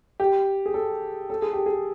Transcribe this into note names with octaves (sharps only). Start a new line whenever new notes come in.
G4
G#4
A4
A4
G#4
G4
G#4